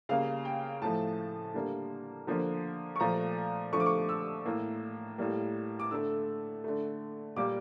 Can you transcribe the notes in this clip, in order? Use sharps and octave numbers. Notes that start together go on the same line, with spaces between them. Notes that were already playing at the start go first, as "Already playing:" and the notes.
C#3 G3 A#3 F5
G5
A2 F3 A3 A5
D3 G3 A#3
D3 F3 A#3
C#6
A#2 F3 A3 A#5
D3 F3 A3 C#6
D6
C#6
E6
A2 E3 A#3
A2 G3 A#3
D6
D3 A3 E6
D3 A3
A#2 G3 A#3 D6